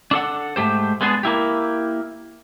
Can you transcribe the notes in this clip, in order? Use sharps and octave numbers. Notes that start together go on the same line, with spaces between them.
D4 A4 F#5
G#2 A3 G4 C5
G#3 B3 D4 G#4
A#3 E4 G4